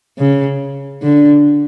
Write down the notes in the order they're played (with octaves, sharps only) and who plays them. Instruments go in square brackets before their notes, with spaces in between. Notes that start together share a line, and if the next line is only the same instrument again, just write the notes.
[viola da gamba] C#3
D3